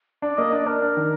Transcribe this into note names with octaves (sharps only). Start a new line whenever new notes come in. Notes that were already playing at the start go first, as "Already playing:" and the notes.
D4 D5
A#3 D#5
D4 D5
D4 A#4
D4
D#3